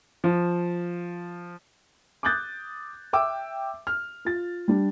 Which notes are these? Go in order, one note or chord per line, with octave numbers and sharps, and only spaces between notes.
F3
D6 D#6 F#6 G6 A6
E5 G5 D6 E6
F6
F4 A6
G3 D4